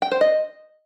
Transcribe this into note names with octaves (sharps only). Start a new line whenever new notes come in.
G5
C5
D#5